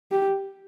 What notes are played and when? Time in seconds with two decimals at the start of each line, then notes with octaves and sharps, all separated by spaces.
0.11 G4